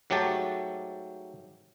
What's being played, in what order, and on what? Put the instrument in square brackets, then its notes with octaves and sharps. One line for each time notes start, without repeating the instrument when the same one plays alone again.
[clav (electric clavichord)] G#2 F#3 A3 G4 A5